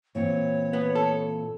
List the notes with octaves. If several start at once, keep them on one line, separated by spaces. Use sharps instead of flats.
A#2 E3 C4 C#5
B3
A4